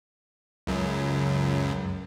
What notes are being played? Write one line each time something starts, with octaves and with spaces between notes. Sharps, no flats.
C#2 F#2